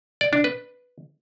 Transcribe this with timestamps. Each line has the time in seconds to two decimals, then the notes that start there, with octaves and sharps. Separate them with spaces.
0.21 D5
0.33 D4
0.44 B4